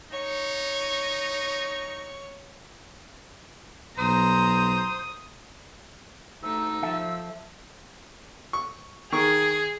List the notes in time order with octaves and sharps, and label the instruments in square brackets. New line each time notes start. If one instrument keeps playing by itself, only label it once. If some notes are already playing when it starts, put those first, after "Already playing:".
[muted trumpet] D#4 [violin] C#5 C#6
[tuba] B1 [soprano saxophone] C5 [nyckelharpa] A#5 [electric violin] D#6
[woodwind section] D2 C3 D#4 [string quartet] A3 [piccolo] E6
[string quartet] F3 [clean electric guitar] A4 E5
[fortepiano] C#6
[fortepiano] D#3 C#6 [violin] G#4